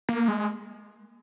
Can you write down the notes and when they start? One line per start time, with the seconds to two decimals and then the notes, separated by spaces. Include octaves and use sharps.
0.09 A#3
0.28 G#3